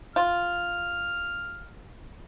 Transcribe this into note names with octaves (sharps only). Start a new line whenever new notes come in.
F4 F6